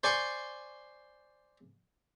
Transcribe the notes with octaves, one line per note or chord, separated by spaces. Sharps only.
C5 D5 G#5 C6 C#6